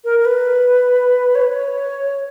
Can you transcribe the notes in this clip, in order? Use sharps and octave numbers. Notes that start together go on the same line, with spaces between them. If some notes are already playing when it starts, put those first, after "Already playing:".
A#4
A#4
B4
C#5
B4
C#5